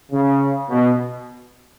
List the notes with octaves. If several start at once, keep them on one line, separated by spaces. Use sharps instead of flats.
C#3
B2